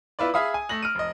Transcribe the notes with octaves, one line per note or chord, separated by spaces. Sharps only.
B3 E4 F4 B4 D5
G#4 E5 F5 B5 D#6
G#5
A3 A#6 F#7
F6 D7 D#7
F1 D#5